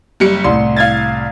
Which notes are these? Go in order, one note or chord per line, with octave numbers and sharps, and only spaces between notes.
F#1 G3 C#7
C2 A2 C6
F5 G#6 A6